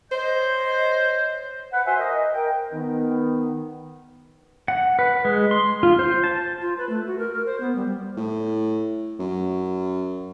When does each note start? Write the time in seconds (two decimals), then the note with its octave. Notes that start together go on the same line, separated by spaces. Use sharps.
0.11 C5 C#5 D#5 G6
1.71 B4 F#5
1.85 F#4 C5 E5 G#5
1.99 A#4 D#5
2.32 A#4 G5
2.73 D#3 B3
4.68 F#5
4.99 B4
5.25 G#3
5.51 C6
5.83 F4
5.99 C5
6.24 A5
6.62 F4
6.78 B4
6.89 A3
7.06 F#4
7.18 A#4
7.34 A#4
7.46 C5
7.60 B3
7.76 G3
8.17 A2
9.19 F#2